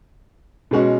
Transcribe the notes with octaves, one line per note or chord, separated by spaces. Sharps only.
B2 G#3 C#4 F#4